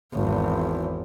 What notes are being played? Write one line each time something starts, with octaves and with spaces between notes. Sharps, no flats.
G#1 E2